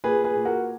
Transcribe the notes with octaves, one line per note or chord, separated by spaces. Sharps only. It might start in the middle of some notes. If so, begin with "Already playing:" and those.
A#2 G#4 B4
G#4 B4
A#2
F#4 A#4